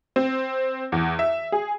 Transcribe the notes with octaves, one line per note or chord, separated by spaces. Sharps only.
C4
E2
E5
G#4